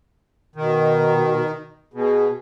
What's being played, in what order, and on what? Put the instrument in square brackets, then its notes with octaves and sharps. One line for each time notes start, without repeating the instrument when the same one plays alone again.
[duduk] B2 [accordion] D#3
[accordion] B2 [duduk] G#4